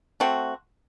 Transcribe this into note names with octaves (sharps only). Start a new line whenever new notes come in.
A3 C4 F#4